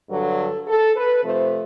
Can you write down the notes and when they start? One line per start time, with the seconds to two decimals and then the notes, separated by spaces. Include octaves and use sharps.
0.10 G2 D3 F#3 A4
0.67 A4
0.96 B4
1.24 C3 F3 A3 C5